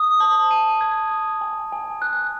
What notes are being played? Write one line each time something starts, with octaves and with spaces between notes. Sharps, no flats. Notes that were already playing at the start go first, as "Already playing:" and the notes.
Already playing: D#6
A5
D#7
G#6
D#6
G#5
G#5
F#6